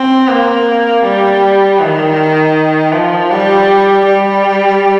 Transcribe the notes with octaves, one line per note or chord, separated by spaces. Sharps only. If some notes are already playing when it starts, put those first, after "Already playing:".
Already playing: C4
A#3
G3
D#3
F3
G3
G3